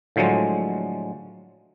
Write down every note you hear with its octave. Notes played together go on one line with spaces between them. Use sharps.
A2 D3 F3 F#3 G#3